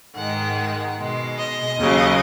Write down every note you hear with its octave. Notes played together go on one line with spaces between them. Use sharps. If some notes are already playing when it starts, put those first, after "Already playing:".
G#2 D#3 G#3 F#5
F#5
B2 G#3
D#5
D#2 C#3 F#3